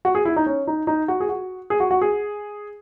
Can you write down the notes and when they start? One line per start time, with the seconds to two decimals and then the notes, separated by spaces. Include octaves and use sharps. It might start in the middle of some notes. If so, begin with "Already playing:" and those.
0.05 F#4
0.15 G#4
0.25 E4
0.36 D#4
0.46 C#4
0.67 D#4
0.87 D#4
1.08 F#4
1.20 G#4
1.29 F#4
1.70 G#4
1.80 F#4
1.91 F#4
2.02 G#4